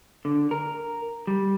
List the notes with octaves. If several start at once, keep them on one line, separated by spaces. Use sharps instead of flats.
D3
A#4
G3